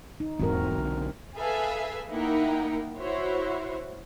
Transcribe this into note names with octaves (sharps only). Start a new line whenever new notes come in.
D#4
D#1 E2 G#2 C4 F#4 A#4
B1 D3
G#4 A4 B4 E5 F5 G#5
A#3 D#4 E4 A#4 F#5 G5
E4 F#4 C5 C#5